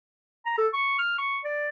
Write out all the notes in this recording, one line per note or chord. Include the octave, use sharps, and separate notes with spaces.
A#5
A4
C#6
F6
C#6
D5